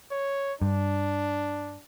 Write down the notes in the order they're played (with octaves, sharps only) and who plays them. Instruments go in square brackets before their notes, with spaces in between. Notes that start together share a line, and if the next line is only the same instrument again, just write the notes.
[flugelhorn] C#5
[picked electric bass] G2 [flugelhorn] D4